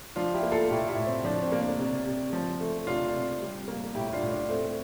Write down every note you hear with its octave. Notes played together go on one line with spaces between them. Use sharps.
F3 D4 F4
E4 G4
A#3
F4 A4
A2 E4 G4
E4 G4
A2
C4
F3 D4
C4
A#3
D4
C3
C3
F3
A3
C3 D4 F4
C3
G3
A#3
A2 E4 G4
D4 F4
A2
D4
A3 C4